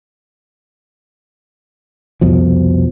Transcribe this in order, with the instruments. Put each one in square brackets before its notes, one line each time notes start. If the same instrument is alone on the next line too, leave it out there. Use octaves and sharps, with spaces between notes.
[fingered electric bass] C2 F2 B2 F3